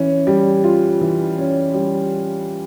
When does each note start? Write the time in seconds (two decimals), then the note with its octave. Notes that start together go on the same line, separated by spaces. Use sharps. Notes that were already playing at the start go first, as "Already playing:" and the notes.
Already playing: E3 C#4
0.27 G3
0.64 F4
1.01 E3
1.38 C#4
1.74 G3